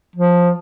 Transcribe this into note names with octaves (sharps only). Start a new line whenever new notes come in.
F3